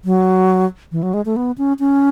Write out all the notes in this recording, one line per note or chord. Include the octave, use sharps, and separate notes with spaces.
F#3
E3
F#3
G#3
A3
B3
C#4
C#4